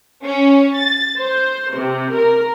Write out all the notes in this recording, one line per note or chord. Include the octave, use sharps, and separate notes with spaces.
C#4
A6
C5
C3
A#4